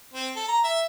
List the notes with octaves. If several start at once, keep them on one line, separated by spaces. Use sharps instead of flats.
C4
A4
A#5
E5